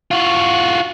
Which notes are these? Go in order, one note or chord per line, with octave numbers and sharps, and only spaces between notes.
F4 F#4